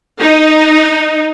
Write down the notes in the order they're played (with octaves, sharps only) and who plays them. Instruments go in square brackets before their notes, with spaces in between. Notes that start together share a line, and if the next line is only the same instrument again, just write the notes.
[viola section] D#4